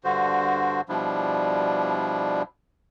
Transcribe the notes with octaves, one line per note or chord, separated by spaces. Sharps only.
G2 D3 F#4 C5
B2 F3 G3 D4 E4